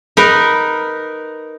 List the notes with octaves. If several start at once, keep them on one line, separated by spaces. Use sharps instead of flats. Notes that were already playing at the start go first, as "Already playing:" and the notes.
D#4 A#4 B4